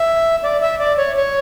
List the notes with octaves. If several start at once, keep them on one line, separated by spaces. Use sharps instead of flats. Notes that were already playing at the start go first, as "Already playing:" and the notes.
Already playing: E5
D5
E5
D5
C#5
C#5